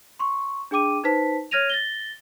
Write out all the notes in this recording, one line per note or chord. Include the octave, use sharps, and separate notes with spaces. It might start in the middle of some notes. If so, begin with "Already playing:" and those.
C6 C#6
D4 G#4 G5 D6 D#7
D#4 B4 C5 A5 B6
C#5 F6 G#6 A#6 D#7 F7
A6 A#6 G7